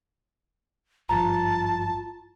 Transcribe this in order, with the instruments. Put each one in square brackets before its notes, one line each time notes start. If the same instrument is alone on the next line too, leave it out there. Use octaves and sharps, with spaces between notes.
[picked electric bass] G#1 G2 F3 [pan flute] F4 [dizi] A5 [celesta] A#5